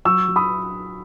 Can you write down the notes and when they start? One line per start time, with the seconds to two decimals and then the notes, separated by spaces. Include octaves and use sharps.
0.05 F#3 C#6 E6
0.28 F#3
0.36 B5 D#6